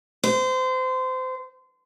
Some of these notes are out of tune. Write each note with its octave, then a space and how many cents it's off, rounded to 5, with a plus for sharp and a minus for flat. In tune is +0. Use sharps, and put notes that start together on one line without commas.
C5 -25